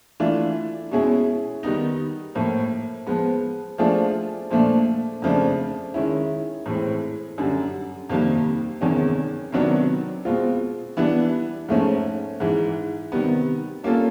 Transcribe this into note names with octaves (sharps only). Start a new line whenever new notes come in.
E3 A3 D4 F4
B2 G#3 C#4 E4 G#4
D#3 G3 B3 D#4
A2 F3 A#3
F3 G#3 B3
F3 A3 D4 F4 G#4
A#2 F3 A3 D4
F2 C#3 F3 A3 D4
D#3 G#3 C#4 E4
A2 E3 G#3 C4
F#2 D3 G3
F2 C3 D#3 G3 A#3
E2 C3 D#3 G#3 C#4
C3 D#3 F#3 B3 D4
B2 G#3 C4 F4
E3 G3 B3 D4
G#2 F3 A3 C#4
G#2 E3 G#3
C3 D#3 G3 B3
G3 A#3 C#4 F4 A4